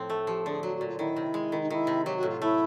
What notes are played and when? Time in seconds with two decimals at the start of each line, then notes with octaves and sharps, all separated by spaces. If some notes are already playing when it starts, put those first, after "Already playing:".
Already playing: A2 F3 C4
0.10 A3
0.27 F3 G4
0.45 D3 G#4
0.63 F#3 F#4
0.76 F#4
0.81 A#2
0.87 F4
0.98 D#3 E4
1.16 C3
1.34 G#3
1.52 D#3
1.60 D#4
1.70 D#3 E4 F4
1.87 C3
2.04 F#3 G4
2.16 F#4
2.23 A2
2.28 F4
2.42 A3 E4